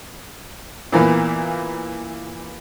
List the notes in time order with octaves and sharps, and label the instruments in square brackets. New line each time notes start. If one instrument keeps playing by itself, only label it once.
[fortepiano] A#2 E3 A#3 B3